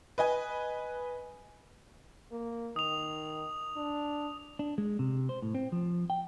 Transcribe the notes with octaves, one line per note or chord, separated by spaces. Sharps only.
B4 D#5 G#5
A#3
D#3 D#6 F7
D4
D4
G#3
C3
C5
A2
C4
F3
G5